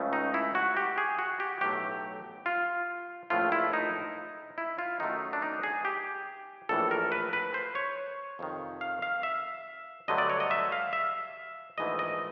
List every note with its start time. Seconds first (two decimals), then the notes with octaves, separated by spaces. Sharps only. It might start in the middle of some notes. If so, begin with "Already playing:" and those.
Already playing: C#2 C#3 F3 A3
0.13 D#4
0.34 E4
0.55 F#4
0.77 G4
0.98 G#4
1.19 F#4
1.40 G4
1.61 B1 A2 F#3 A3 G4
2.46 F4
3.30 A#1 A2 F3 A3 F4
3.52 E4
3.73 D#4
4.58 E4
4.79 F4
5.00 F#2 D#3 F#3 A3 D#4
5.33 D4
5.42 D#4
5.63 G#4
5.85 G4
6.69 A#1 A2 E3 A4
6.91 A#4
7.12 B4
7.33 B4
7.54 C5
7.75 C#5
8.39 F2 C3 D#3
8.81 F5
9.02 F5
9.23 E5
10.08 G2 D3 F#3 A3 D#5
10.18 D5
10.30 C#5
10.40 D#5
10.51 E5
10.72 F5
10.93 E5
11.78 A#1 G#2 E3 A3 D#5
11.99 D#5